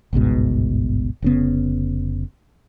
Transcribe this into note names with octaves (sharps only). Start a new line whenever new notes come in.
G1 C#2 G#2 B2
F1 C#3 B3